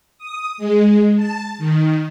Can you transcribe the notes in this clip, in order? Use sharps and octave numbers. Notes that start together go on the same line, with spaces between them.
D#6
G#3
A5
D#3